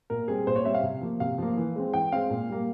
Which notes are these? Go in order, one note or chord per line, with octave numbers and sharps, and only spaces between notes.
A#2 A#4
G3 C4 G#4
A#2 C5
C#5
G3 C4 E5
F5
C3
F3 A#3
C3 F5
F3 A#3
E3
G#3 C4
E3 G5
G#3 C4 F5
A#2
G3 A#3